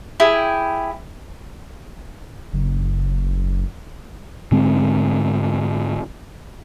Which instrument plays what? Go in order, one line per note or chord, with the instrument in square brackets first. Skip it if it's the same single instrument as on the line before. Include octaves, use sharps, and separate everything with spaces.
[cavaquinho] E4 G4 G#4 G5
[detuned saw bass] F#1
[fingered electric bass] G#2 D3 G#3 C4